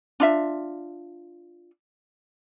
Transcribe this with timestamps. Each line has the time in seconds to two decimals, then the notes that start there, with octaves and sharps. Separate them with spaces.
0.20 D4 F4 E5